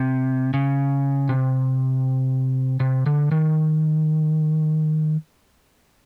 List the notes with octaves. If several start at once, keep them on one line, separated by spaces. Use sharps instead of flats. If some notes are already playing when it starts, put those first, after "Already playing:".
Already playing: C3
C#3
C3
C3
D3
D#3